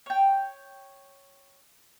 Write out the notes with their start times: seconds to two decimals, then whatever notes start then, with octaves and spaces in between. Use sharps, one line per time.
0.06 C#5 G5